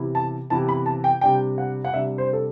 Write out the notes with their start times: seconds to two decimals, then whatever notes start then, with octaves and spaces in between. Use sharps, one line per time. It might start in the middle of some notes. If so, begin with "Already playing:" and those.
Already playing: C3 E3 B3 E4 G4
0.15 A5
0.50 C3 E3 B3 E4 G4 A5
0.69 B5
0.86 A5
1.04 G5
1.21 C3 G3 D4 G4 G5
1.58 F#5
1.85 F#5
1.93 C3 G3 D4 G4 E5
2.18 C5
2.33 A4